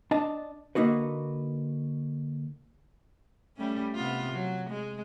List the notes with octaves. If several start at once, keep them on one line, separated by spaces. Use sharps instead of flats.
D4 D#5 A5
D3 A#3 D#4 F#4 B4
G3 A3 C#4
C3 B3 F4
F#3
G#3